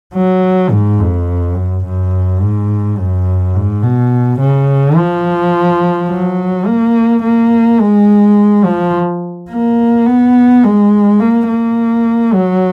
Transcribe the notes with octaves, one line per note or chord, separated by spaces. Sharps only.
F#3
G#2
F2
F#2
F#2
G#2
F#2
G#2
B2
C#3
F3
F#3
A#3
A#3
G#3
F3
A#3
B3
G#3
A#3
A#3
F#3